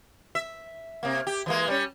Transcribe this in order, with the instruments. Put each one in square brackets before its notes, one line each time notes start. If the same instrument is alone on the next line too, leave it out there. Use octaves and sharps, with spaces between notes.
[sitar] E5
C3 A#3
G4
E3 G#3 A#3
G3 C#4